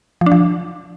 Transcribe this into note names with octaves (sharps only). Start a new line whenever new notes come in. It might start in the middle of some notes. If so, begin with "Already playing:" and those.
F3
D4
F3